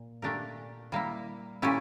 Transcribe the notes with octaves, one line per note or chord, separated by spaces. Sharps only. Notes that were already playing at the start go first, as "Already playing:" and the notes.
Already playing: A#2
A#2 A3 D4 G4 A#4
G3 A#3 E4
A#2 A3 C#4 E4 G4